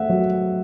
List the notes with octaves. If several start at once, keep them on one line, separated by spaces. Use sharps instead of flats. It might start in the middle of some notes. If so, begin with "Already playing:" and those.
Already playing: A3 E5 F#5
F#3